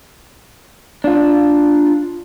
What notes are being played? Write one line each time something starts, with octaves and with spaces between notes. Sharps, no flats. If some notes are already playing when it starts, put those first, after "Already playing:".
D4 F4